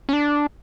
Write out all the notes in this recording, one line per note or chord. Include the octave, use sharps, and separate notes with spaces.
C#4
D4